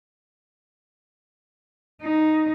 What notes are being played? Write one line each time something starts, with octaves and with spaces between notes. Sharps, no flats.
D#4